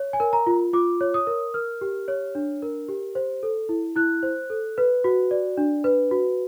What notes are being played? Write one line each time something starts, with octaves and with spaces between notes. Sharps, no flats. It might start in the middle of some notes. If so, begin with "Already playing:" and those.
Already playing: C#5
G#5
A#4
A#5
F4
F4 D6
C#5
D#6
A#4
A#4 F6
G4
C#5
D4
A#4
G4
C5
A4
E4
E4 F#6
C5
A4
B4
F#4
D5
D4
B4
F#4